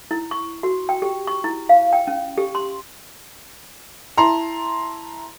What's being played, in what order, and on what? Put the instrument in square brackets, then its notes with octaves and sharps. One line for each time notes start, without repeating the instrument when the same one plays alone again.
[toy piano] E4
C#6
F#4
G5
G4
C#6
E4
F5
G5
C#4
G4
C6
[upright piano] E4 A5 A#5 C6